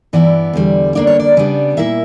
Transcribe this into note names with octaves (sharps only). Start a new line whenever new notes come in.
G2 E3 B3 E4 D5
E2 D3 G3
D2 D3 A#3 D4 D5
C#5
D5
C#3 G3 B3 D4
A#2 A#3 E4 E5